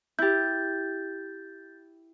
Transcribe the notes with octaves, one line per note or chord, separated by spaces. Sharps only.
E4 G4 G6 A6